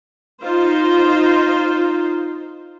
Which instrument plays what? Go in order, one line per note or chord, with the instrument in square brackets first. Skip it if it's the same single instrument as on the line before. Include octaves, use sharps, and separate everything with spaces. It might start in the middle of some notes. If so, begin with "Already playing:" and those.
[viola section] D#4 F4 C5